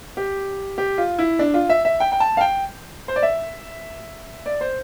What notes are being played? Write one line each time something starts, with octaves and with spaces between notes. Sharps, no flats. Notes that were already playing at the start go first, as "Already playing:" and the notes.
G4
G4
F4
E4
D4
F4
E5
E5
G5
G5
A5
F5
G5
C5
D5
E5
D5
C5